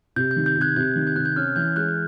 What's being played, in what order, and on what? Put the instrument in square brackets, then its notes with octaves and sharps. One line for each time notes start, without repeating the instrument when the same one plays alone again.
[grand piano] C3 [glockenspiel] G6
[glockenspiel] G6
[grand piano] D#3
[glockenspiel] G6
[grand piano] C3
[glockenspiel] F#6 G#6
[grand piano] C3 [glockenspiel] G6
[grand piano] D#3
[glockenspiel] G6
[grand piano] C3 [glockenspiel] F#6
[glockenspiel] G6
[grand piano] C#4 [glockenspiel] F6
[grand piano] E3 [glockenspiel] G6
[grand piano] G#3 [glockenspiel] F#6